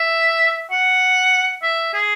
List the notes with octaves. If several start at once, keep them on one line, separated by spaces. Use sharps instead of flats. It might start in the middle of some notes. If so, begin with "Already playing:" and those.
Already playing: E5
F#5
E5
G#4